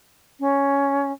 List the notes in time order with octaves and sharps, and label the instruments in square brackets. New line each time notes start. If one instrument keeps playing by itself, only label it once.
[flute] C#4